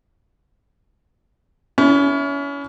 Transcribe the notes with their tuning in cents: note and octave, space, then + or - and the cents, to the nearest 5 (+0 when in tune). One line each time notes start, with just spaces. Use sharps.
C#4 +30 E4 +0